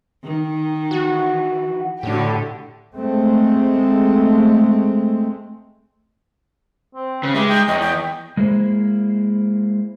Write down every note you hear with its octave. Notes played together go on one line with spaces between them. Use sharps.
D#3
E3 F#4
A2 D3 F#4 G4
G#3 A3 C4
C4
C#3 B4
G#3 G4 E5
D#4 G5
E2 C#5 D#5
D#5 G5
G#3 A#3 E4 G#4 C5